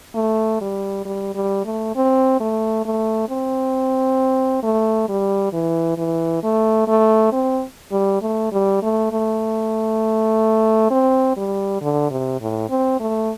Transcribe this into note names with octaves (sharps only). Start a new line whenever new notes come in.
A3
G3
G3
G3
A3
C4
A3
A3
C4
A3
G3
E3
E3
A3
A3
C4
G3
A3
G3
A3
A3
C4
G3
D3
C3
A2
C4
A3